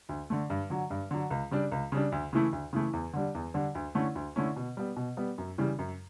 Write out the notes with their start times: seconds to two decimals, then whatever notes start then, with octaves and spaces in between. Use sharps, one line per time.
0.09 D2
0.30 D3 A3
0.50 G2
0.70 D3 F#3
0.90 G2
1.11 D3 F#3
1.31 C#2
1.51 C#3 G3 D4
1.72 C#2
1.92 C#3 G3 D4
2.12 D2
2.33 C#3 E3 A3 E4
2.52 D2
2.73 C#3 E3 A3 E4
2.93 E2
3.13 D3 G3 D4
3.35 E2
3.54 D3 G3 D4
3.75 D2
3.95 D3 A3 C#4 E4
4.15 D2
4.36 D3 A3 C#4 E4
4.56 B2
4.77 G3 B3
4.96 B2
5.17 G3 B3
5.38 F#2
5.58 C#3 E3 G3
5.79 F#2